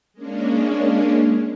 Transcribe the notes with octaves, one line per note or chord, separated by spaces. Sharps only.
G#3 A#3 C#4 D4